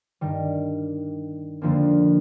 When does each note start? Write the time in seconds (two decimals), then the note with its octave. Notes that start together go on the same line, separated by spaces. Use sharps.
0.21 G2 D#3 G3
1.61 F2 D3 F3 A#3 D4